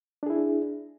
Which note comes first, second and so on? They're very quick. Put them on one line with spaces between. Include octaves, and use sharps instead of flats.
D4 G#4 E4